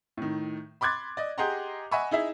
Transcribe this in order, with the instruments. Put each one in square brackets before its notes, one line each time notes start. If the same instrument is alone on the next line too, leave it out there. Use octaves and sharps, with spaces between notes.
[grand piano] A2 D#3
B5 C6 D6 F#6 G#6 A6
D5 D#5
G4 G#4 D#5 F#5 A#5 C6
D#5 E5 F#5 G#5 B5 C#6
D#4 E4 G#4 E5